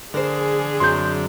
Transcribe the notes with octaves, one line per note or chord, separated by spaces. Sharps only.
D3 G#4 A#4 C5
F#2 F#3 C4 C6 G6